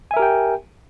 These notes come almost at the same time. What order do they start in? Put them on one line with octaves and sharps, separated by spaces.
G#5 E5 A#4 G4 G5